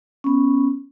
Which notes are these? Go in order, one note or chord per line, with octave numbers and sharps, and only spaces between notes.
B3 C#4